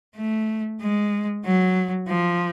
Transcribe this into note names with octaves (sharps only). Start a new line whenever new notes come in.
A3
G#3
F#3
F3